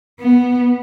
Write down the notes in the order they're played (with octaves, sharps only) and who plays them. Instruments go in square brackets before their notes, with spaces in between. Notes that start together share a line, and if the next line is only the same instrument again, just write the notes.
[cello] B3